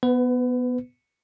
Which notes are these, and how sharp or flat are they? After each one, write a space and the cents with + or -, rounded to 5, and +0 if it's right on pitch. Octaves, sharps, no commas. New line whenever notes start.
B3 +0 B4 +30